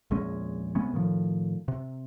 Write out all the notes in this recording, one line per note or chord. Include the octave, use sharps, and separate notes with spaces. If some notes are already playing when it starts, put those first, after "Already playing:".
A#1 E2 G#3 C#4
C3 G#3 B3 C#4
A2 D#3 F3
C3